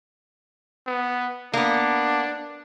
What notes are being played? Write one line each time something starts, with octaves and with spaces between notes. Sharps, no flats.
B3
A#3 B3 D4